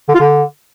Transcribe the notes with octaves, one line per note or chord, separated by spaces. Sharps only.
D3
F4
D3